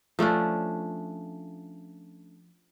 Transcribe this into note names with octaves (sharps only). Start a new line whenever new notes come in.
F3 A3 C#4 D4